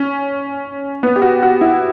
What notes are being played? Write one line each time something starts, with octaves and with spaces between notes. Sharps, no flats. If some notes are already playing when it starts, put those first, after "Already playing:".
Already playing: C#4
B3
G4
F#4
F#4
E4